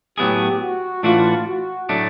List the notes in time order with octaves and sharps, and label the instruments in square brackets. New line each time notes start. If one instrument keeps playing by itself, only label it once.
[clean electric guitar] A2 F#3 B3 E4 G#4 [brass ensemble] G4
[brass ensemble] F#4
[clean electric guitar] A2 E3 A3 D4 F#4 [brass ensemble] F4
[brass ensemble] F#4
[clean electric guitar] A2 F#3 A3 D4